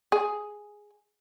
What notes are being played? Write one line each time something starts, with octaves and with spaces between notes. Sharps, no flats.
G#4